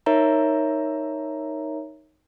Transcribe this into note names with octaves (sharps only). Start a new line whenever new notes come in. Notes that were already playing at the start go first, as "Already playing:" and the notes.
D#4 A#4 C#5 E5 A#5